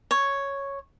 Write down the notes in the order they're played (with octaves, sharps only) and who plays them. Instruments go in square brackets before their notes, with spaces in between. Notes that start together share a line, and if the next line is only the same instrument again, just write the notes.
[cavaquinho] C#5